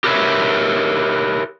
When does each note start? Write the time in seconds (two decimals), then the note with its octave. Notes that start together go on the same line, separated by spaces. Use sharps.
0.04 G4 A#4 B4 C#5 E5